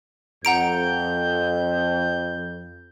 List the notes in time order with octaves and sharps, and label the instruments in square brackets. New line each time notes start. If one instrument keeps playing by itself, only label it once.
[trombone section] F2 [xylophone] F#5 A#5 D7 [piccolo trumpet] G6